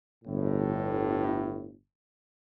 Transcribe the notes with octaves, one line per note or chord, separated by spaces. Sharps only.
G1 A2